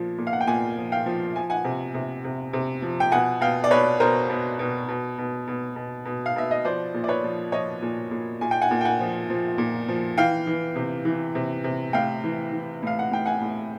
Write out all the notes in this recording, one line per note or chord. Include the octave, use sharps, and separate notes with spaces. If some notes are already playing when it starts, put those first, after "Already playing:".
Already playing: A#2 F3
A#2
F5
F#5
G5
A#2 F#5 G#5
F3
F5 G5
F3
F3 G#5
F#5 G#5
C3
C3
C3
C3
F3
G5
B2 F#5 G#5
B2 F5 G5
D5
B2 B4 C#5
B2 A#4 C5
B2
B2
B2
B2
B2
B2
B2
F5
B2 E5
D#5
F3 C5 D5
A#2
D5
B4 C#5
F3
F3 C#5 D#5
A#2
A#2
A#2 G#5
G5
F#5 G#5
A#2
G5
F#5 G#5
F3
F3
A#2
F3
E3 F5 G5
E3
C3
E3
C3
C3
A2 F5 G5
E3
E3
A2 F5
F#5
A2 G5
F#5 G#5
A2